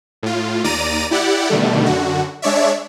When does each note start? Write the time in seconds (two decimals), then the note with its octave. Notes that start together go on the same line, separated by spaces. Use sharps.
0.23 A2 F4
0.64 D#2 D5 A#5 D#7
1.11 E4 G4 D5 F#5
1.49 B2 D3 D#3 G3 A3
1.86 F#2 D3 F#4
2.42 G#3 D4 C#5 D5 E5